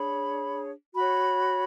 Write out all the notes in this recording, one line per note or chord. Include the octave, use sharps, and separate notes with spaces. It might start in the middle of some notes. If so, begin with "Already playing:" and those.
Already playing: D4 G#4 C#5 B5
F#4 C#5 B5